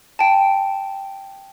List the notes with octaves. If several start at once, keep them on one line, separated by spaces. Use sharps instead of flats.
G5 A5